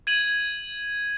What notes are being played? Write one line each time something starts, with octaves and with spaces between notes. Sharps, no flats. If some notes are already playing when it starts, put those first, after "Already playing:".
G#6 D#7 F#7